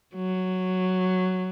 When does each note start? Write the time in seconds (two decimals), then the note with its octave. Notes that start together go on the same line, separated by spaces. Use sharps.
0.15 F#3